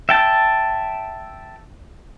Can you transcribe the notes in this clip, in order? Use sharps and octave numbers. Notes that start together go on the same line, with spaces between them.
E5 G5 A5